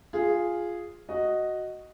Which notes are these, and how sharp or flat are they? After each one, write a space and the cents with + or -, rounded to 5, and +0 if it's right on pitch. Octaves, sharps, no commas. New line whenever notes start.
F4 +0 G#4 -5
F#4 +0 D#5 +0